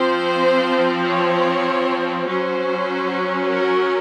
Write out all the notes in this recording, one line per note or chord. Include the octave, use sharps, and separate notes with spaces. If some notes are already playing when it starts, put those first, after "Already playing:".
Already playing: F3 C4 C5
C#5
F#3 C#4 C5
A#4